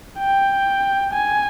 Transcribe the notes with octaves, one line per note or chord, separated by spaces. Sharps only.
G5
G#5